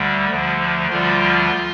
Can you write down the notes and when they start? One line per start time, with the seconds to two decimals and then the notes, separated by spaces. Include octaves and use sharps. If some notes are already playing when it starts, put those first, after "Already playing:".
Already playing: D2 D3 G3
0.30 D2 D3 F3
0.90 D2 D3 F3 G3 F4